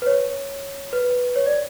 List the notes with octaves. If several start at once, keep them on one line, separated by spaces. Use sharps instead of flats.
B4
C#5
B4
C#5
D5